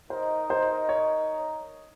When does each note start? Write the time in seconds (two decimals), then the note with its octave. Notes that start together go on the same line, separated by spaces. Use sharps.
0.10 D#4 A#4 C5 D#5
0.50 C5
0.89 C#5